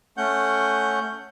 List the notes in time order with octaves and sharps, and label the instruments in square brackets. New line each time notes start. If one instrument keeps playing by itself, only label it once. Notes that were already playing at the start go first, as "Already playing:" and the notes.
[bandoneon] A3 C#4 F#5 G6